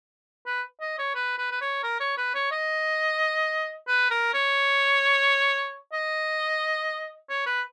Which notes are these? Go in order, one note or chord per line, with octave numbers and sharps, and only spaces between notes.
B4
D#5
C#5
B4
B4
B4
C#5
A#4
C#5
B4
C#5
D#5
B4
A#4
C#5
D#5
C#5
B4